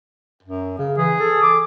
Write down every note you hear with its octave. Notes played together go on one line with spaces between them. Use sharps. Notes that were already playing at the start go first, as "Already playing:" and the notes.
F#2
C#3
E3 G#4
A4
D6